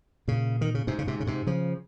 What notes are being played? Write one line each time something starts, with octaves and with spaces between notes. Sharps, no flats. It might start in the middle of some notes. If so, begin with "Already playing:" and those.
A#2 C#3
D#3
C#3
G#2 C3
C#3
G#2 C3
C#3
G#2 C3
C#3 F3